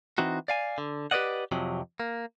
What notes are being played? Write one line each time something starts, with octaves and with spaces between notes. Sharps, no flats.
E3 C4 D#4 F#4
D5 F5 G#5
D3
G4 B4 C5 D5 D#5 F#5
F2 C3 F3 F#3
A#3